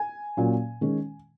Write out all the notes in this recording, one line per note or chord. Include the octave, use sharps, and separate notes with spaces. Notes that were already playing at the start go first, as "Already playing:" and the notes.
Already playing: G#5
A#2 F#3 C#4
D#3 G#3 C#4